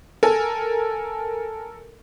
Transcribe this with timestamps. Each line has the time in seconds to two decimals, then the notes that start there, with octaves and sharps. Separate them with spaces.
0.23 A4 A#4 G#5